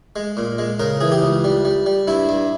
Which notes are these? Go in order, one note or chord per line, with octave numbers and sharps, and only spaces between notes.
G#3
A#2
G#3
C#3 A#4
E3 G#4
G4
C#2
G3
G3
G3
G2 E4
G2